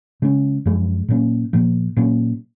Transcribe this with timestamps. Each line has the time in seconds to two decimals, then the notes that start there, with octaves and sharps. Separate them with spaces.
0.22 C#3 G#3 C#4
0.66 F#2 F3 G#3
1.08 A#2 F#3 A#3 C#4
1.53 A#2 F3 B3
1.97 A#2 F#3 A#3 C#4